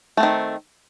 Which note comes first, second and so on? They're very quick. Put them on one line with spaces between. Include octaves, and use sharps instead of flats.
A3 C4 D#3